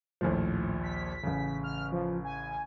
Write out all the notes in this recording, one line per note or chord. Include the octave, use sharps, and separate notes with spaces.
A#1 D#2 A2 F3
B6
A1 C#3
F6
F3
G#5